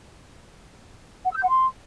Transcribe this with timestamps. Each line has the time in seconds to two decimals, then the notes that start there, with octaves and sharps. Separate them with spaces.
1.24 F#5
1.30 E6
1.37 G6
1.43 F#5
1.49 C6